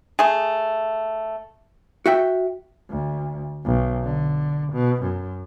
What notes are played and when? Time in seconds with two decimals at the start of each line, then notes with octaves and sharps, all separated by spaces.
0.19 A3 G#4
2.06 F#4 E5 G5
2.90 D2
3.65 B1
4.04 D3
4.73 B2
5.02 F#2